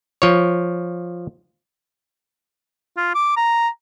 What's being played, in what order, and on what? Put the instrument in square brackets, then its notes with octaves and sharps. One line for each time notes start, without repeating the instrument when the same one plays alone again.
[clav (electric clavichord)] F3 C#5
[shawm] F4
D6
A#5